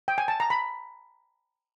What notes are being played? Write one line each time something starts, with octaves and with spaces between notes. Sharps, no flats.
G5
G#5
A5
A#5
B5